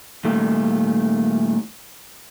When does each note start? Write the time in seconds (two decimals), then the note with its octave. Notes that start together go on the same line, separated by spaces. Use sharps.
0.24 A#2 D#3 G3 A3